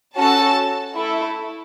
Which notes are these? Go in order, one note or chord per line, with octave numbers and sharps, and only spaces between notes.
C#4 F#4 A4 A5
A3 E4 A4